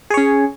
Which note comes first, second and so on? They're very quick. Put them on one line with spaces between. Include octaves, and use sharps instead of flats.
G#4 C#5 C#4